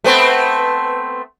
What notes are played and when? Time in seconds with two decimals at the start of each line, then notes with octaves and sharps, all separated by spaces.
0.04 A3 B3 C4